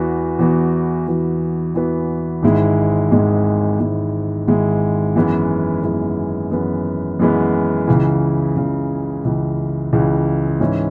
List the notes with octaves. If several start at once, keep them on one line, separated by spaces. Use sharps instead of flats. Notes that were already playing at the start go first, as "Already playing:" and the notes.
Already playing: E2 E3 B3 F#4
E2 E3 B3 F#4
E2 E3 B3 F#4
E2 E3 B3 F#4
G#1 G#2 G#3 E4
G#1 G#2 G#3 E4
G#1 G#2 G#3 E4
G#1 G#2 G#3 E4
F#2 E3 G#3 B3
F#2 E3 G#3 B3
F#2 E3 G#3 B3
F#2 E3 G#3 B3
C#2 C#3 E3
C#2 C#3 E3
C#2 C#3 E3
C#2 C#3 E3
G#2 E3 C#4 E4